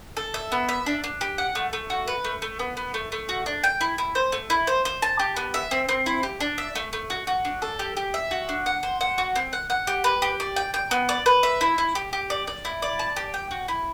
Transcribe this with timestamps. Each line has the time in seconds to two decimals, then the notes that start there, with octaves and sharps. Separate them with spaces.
0.17 A4
0.34 E5
0.52 B3
0.69 E5
0.86 D4
1.04 D4
1.21 G4
1.38 F#5
1.55 A3
1.73 A3
1.90 F#4
2.08 B4
2.25 A3
2.42 A3
2.59 B3
2.77 B3
2.94 A3
3.12 A3
3.29 F#4
3.46 D4
3.64 G5
3.81 E4
3.98 E4
4.15 C5
4.32 A3
4.50 E4
4.67 C5
4.85 C5
5.02 A5
5.19 G4
5.37 B3
5.54 E5
5.71 C4
5.89 C4
6.06 E4
6.23 G4
6.41 D4
6.58 E5
6.75 A3
6.93 A3
7.10 F#4
7.27 F#4
7.45 D4
7.62 A4
7.79 G4
7.97 G4
8.14 E5
8.31 F#4
8.49 D4
8.66 F#5
8.83 C5
9.01 F#5
9.18 F#4
9.36 C4
9.53 F#5
9.70 F#5
9.87 G4
10.04 B4
10.22 G4
10.40 D5
10.56 G5
10.74 G5
10.91 B3
11.09 D5
11.26 B4
11.43 E5
11.61 E4
11.78 E4
11.95 G4
12.13 G4
12.30 D5
12.47 D5
12.65 E4
12.82 D5
12.99 A5
13.16 G4
13.34 G5
13.51 F#4
13.68 E4